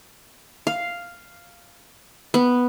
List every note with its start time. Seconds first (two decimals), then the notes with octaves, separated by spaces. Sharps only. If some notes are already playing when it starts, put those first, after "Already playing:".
0.67 F5
2.34 B3